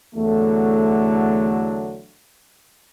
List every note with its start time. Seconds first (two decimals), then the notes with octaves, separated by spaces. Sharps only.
0.15 E2 D3 F#3 A3